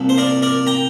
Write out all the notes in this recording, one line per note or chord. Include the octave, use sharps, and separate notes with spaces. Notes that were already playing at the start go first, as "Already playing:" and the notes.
Already playing: C2 A#2 F3
C5
A#4 D5
A#4 D5
G5 A#5